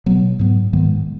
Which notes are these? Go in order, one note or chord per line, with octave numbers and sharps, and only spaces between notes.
B2 F#3 B3
G#2 F#3 B3
G#2 D#3 G#3 B3